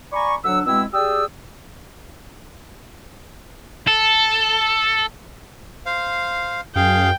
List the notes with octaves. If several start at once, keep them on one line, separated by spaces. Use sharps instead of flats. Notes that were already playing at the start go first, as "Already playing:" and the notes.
D5 G#5 A#5 B5 C#6
D2 F#3 D4 F#5 E6
B2 G#3 C4 E4 E6
G4 G#4 D5 G5 D#6 E6
A4
C5 F5
F#2 G#4 F5 G5